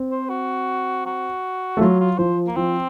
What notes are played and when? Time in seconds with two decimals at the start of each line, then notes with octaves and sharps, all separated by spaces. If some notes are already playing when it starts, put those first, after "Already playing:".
Already playing: C4
0.11 C5
0.29 F#4
1.06 F#4
1.77 A3
1.81 F#3 F4
2.00 F4
2.18 F3 C5
2.47 A#3
2.56 F3 C4